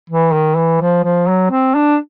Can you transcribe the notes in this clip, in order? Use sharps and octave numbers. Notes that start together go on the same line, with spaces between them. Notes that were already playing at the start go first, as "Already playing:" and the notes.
E3
D#3
E3
F3
F3
F#3
C4
D4